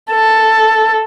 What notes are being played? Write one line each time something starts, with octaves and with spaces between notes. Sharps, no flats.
A4